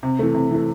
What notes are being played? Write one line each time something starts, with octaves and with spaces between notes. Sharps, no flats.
C3
E3 A3
C3
E3 A3